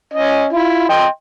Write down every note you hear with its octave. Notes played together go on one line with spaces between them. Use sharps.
C#4 D#5
E4 F4
D#5 G5 C6